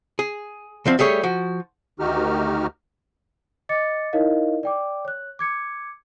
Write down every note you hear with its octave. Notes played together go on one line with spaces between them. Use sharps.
G#4
D2 F3 C4
G3 A3 G#4 C#5
F3 F#4
D2 D#3 D#4 F#4 G4 F6
D#5 D6 A6 C#7
D#4 E4 A#4 C#5 D#5 F5
D5 G5 D6
C#5 F#6
D6 G#6 C#7